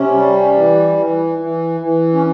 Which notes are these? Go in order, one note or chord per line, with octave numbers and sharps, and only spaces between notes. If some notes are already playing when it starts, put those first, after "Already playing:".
Already playing: C3 C#4
G3
E3
E3
E3
E3
C#4